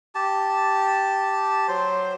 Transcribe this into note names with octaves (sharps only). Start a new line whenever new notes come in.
G4 A5
F#3 C5